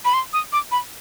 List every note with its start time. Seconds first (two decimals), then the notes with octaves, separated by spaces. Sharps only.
0.05 B5
0.14 C6
0.33 D#6
0.53 D6
0.72 B5